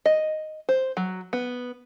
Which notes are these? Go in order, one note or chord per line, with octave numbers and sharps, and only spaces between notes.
D#5
C5
F#3
B3